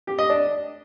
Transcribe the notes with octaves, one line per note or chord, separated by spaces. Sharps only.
G4
D#5
D4